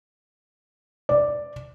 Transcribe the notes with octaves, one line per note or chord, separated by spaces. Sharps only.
D5